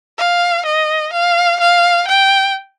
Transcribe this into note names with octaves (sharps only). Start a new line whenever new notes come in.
F5
D#5
F5
F5
G5